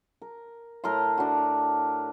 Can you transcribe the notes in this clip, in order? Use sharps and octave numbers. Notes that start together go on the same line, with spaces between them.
A#4
A2 A#4 A5 C6
D4 F#4